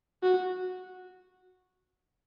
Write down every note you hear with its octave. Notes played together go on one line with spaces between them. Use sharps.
F#4